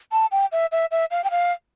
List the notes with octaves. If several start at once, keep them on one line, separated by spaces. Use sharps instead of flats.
A5
G5
E5
E5
E5
F5
G5
F5